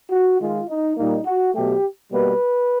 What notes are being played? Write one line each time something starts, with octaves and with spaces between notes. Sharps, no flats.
F#4
D#3 G#3 F4
D#4
A#2 G3 A#3 D#4
F#4
B2 F#3 A3 G4
B2 G3 A#3 B4